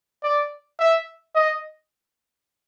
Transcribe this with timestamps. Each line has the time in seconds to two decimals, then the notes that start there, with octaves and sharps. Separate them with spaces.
0.23 D5
0.79 E5
1.35 D#5